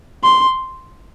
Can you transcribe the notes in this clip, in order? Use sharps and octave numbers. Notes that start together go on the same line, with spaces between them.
C6